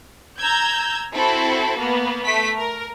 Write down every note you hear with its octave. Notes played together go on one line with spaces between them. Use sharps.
A#5 E6 G6 G#6
C4 E4 F#4 A4
A#3 B3
A3 B6
A#4